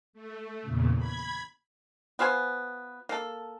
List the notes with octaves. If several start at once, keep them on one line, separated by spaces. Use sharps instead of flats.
A3
E2 A#2 C#3
B5 G#6
B3 F4 C5 G#5
A#3 A4